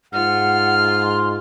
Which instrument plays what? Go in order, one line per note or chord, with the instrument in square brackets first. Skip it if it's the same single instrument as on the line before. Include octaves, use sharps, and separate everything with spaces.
[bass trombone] G#2 [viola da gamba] F4 [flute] F#5 [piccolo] F6
[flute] C6